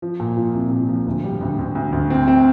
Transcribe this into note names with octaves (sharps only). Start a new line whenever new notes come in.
F3
A#2
F3
C2
A#2
F3
D2
G3
D2
D2
D2
D2
C4
C4